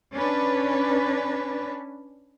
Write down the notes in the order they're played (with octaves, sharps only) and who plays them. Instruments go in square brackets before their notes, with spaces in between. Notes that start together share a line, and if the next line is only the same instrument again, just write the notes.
[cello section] C#4 D4 B4